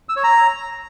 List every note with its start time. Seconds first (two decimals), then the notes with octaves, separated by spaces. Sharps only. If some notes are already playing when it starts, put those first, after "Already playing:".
0.09 E6
0.16 C#5
0.24 A#5